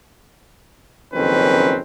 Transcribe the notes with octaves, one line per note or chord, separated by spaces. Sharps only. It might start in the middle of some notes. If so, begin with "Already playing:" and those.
F#1 F2 D#3 C4 C#4 B4